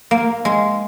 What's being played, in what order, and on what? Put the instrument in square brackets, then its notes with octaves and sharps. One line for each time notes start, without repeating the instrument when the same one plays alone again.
[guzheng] A#3
G#3